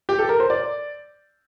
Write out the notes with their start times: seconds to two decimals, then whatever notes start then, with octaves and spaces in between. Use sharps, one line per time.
0.09 G4
0.19 A4
0.29 A#4
0.40 C5
0.50 D5